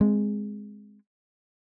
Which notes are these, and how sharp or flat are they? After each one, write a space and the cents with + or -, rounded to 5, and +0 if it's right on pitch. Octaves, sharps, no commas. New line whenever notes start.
G#3 +0 C4 +0